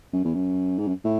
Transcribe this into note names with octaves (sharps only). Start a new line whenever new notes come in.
F#2
E2
F#2
G#2
F#2
A2